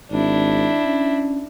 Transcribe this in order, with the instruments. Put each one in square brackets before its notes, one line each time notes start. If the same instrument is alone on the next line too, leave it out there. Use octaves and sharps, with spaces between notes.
[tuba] G#1 [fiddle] D4 E4
[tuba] C#4